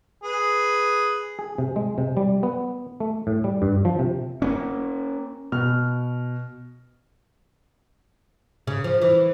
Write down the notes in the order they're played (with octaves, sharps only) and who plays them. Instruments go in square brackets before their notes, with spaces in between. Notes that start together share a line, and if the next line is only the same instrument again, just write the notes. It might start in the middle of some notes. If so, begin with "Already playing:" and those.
[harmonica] G#4 B4
[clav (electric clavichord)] G#4
C3
G#3
C3
G3
B3
A3
A2
G3
G2
F3
C3
[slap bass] A#3 B3 C#4
[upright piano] B2 F6
[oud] C#3
F3
E3